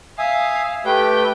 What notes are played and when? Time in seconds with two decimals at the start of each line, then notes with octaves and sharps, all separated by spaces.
0.18 E5 F5 G#5 D#6
0.85 A3 G4 B4 G5